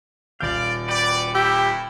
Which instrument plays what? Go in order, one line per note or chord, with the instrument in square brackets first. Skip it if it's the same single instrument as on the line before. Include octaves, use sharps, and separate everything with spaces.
[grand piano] D#1 G6 [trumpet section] D5 [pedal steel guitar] F5
[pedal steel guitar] F#4 B4 G5 [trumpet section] D5
[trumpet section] A3 A#3 E4 [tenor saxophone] G4 [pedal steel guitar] E6